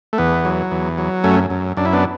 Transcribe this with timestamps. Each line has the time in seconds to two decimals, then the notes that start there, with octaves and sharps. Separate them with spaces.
0.13 A3
0.18 E2 B3
0.45 F#3
0.71 E2
0.98 F#3
1.24 F#2 A3 C#4
1.50 F#2
1.77 F#2 D4
1.85 E4
1.93 B3 D4